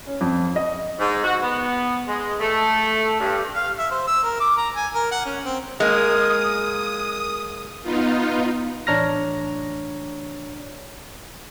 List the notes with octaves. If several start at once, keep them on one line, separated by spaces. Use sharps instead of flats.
C#4
F2
D#5
G#2
F#4
B3
G#3
A3
G2
F5
E5
C5
E6
A#4
D6
A#5
G#5
A#4
F#5
C#4
C4
G#3 A#3 D#6
B3 D#4 F4
A1 D4 C#5 A#5 F6 A#6